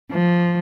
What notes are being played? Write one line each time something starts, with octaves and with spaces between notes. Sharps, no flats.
F3